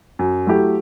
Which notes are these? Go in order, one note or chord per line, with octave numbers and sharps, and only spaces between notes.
F#2
F#3 A3 E4 G4